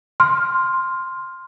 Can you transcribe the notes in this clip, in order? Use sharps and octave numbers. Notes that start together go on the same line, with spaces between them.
C6 F6